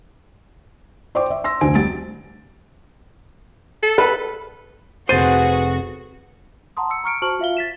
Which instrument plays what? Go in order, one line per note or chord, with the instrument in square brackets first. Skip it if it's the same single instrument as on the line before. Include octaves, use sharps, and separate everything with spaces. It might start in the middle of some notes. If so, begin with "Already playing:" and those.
[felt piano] C5 D5 G5 C#6 D6
E5
C6 E6 A#6
F1 D2 D3 C5 G#5 D7
G3 A6 D7
[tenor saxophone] A4
[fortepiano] B4
[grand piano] F1 A6 D#7 [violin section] F#4 [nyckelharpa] G#4 B4 [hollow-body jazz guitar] C5
[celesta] F#5 A5 A#5 C6 D#6
E6 C#7
A#5 C#6 F6 C#7 D7
F#4 C5 A5 C#6 F6 F#7
F4 E5 F5 G7
A6 B6 E7